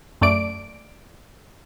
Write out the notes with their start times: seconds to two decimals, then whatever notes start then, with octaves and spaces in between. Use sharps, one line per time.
0.21 F#2 A3 D5 D7